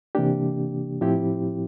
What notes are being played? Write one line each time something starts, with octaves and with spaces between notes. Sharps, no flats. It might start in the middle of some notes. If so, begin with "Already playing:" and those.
C3 E3 A#3 D4 G4
A2 F3 C4 E4 G4